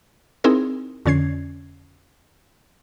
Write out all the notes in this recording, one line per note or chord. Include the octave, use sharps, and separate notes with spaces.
C4 D#4 E4 G#4 A#4
F2 D3 C#4 G#6 C7